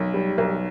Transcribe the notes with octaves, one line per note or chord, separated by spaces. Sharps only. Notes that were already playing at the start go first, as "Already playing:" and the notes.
Already playing: B1
G3
B1